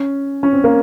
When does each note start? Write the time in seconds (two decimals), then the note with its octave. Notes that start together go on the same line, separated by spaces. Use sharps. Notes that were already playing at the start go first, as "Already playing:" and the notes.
Already playing: C#4
0.43 C#4
0.53 C4
0.64 A#3